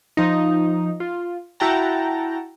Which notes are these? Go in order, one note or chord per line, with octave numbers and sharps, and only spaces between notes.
F3 D#4
F4
E4 F#4 F#5 G5 A5 A#5